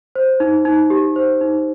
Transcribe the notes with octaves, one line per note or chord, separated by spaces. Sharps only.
C5
D#4
D#4
G4
C5
D#4